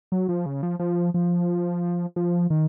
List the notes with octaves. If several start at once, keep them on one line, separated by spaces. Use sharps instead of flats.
F#3
F3
C#3
F3
F3
F3
F3
D#3